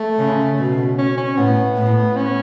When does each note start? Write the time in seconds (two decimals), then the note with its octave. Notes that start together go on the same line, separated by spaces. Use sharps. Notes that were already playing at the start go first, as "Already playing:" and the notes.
Already playing: A3
0.19 C#3
0.58 B2
0.99 C#4
1.18 C#4
1.37 A2 B3
1.77 A2
2.16 C#4